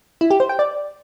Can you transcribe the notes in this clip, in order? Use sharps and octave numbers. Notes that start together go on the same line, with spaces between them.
E4
G4
C5
G5
D5